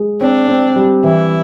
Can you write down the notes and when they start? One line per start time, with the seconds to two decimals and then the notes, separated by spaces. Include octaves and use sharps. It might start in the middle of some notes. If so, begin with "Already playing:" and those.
Already playing: G#3
0.21 C4 D4
0.48 C4
0.76 G3
1.04 E3 E4